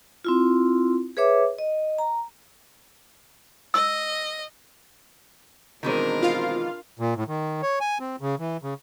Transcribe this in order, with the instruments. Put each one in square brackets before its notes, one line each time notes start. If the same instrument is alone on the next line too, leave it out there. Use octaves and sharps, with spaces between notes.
[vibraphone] C4 E4 F4
G#4 B4 C#5 E5 D6
D#5
A#5
[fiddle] D#5 [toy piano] E6
[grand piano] B2 F#3 C4 [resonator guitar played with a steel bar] D#3 E3 G#3 [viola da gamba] D4 A#4
[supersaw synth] F4 F5
[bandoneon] A#2
A2
D#3
C#5
G#5
C4
C#3
E3
C#3